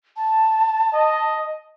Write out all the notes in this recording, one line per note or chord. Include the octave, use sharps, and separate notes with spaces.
A5
D#5